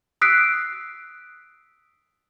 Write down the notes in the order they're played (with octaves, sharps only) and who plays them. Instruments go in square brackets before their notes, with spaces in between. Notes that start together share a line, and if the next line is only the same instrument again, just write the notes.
[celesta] D#6 E6 F#6 B6 C7 D7